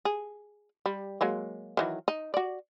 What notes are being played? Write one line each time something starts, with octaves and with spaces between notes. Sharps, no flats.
G#4
G3
F#3 G#3 A#3
D#3 E3 F#3
D#4
F#4 D5